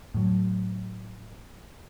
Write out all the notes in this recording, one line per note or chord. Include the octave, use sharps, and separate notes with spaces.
A2 F#3